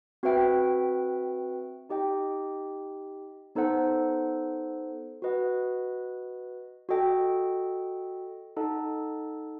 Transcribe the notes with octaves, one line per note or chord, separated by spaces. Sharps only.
C4 F#4 B4 E5 G5
D#4 G4 D#5 G5
B3 D#4 A4 C5 F#5
F#4 B4 D#5 F#5
F#4 A4 D#5 G5
D#4 A4 D#5 F#5 A5